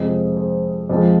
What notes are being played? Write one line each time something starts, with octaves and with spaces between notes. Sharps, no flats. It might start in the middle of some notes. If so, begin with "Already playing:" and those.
Already playing: F2 C3 F3 G#3 D#5
C5
F2 F3 G#3